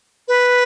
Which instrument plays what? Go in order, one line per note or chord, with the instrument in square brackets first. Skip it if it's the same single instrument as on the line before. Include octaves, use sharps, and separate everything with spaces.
[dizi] B4